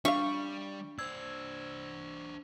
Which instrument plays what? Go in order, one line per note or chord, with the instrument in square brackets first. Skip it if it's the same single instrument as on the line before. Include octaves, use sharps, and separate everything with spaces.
[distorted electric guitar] G3 [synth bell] D4 [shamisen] E5 F5 [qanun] C#6
[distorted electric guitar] D4 C5 [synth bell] E6 G#6